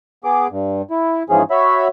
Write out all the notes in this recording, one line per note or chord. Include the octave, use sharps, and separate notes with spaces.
B3 G#4 D6
G2
E4
G#2 E3 F3 C#4 G#4
F#4 C#5 E5 B5